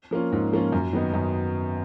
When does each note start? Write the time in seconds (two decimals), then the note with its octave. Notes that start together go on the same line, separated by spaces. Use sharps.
0.11 F3 A#3 C#4 F4
0.32 G#2
0.52 F3 A#3 C#4 F4
0.72 F#2
0.93 D#3 F#3 B3 D#4
1.14 F#2